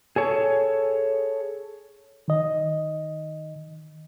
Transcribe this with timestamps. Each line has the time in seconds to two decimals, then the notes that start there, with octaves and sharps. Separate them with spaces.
0.16 G#4 A4 C#5
2.28 D#3 D#5